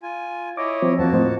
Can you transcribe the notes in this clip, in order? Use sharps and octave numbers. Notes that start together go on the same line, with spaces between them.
F4 G#5
E4 C#5 D#5 D6
F3 C4
E2 A#3 F#4 A5
A2 C5 D#5